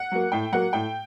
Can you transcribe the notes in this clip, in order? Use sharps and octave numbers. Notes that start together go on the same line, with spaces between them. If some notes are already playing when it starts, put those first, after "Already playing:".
Already playing: F#5
F#3 A#3
A2 G5
F#3 A#3 F#5
A2 G5